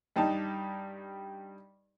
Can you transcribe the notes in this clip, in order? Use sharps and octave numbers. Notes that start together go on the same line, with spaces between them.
G2 G3 D#4 A5